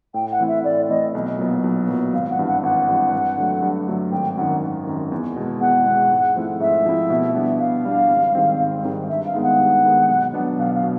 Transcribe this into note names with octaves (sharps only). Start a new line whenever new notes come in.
A2 G5
F#5
E3 A3 C4 E4
E5
A2 D5
E3 A3 C4 E4 D#5
B1
A#2 F#3 B3
B1
A#2 F#3 B3
G#1 F5
F#5
G2 E3
F#5
G#1 F#5
G2 E3
G2
D3 F#3 A3
G2
D3 F#3 A3
G#1 G5
F#2 D#3 F#5
G#1
F#2 D#3
E2
B2 G#3
E2 F#5
B2 G#3
G#2
F3 A3 C4 E4
G#2 E5
F3 A3 C4 E4
B2
G3 B3 D4
B2 F5
G3 B3 D4
G#1
G#2 D#3 G3 C4
G#1
G#2 D#3 G3 C4
G2 E5
F5
D#3 G#3 B3 D#4
F#5
G2
D#3 G#3 B3 D#4
B1
B2 F#3 B3 D4
B1 F5
F5
B2